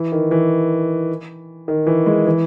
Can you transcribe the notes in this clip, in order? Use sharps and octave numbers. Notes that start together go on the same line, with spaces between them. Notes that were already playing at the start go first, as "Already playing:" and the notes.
Already playing: E3
D#3
E3
D#3
E3
G#3
E3